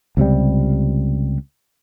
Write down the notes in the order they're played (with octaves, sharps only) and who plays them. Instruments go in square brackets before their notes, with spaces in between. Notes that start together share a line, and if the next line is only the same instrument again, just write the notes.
[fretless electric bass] C#2 C3 G3